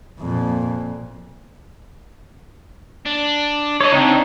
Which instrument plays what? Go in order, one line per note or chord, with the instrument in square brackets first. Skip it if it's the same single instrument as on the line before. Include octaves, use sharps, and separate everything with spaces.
[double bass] F2 A#2
[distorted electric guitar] D4
[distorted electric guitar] A4 D#5 [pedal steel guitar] C#5
[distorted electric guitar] C#3 [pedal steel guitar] C4 D4 D#4